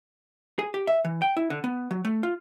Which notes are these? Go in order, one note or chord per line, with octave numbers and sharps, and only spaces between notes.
G#4
G4
E5
E3
G5
E4
D3
B3
F#3
A3
F4